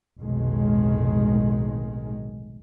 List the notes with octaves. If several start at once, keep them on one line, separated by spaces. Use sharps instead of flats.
F1 B1 A2 D#3 G#3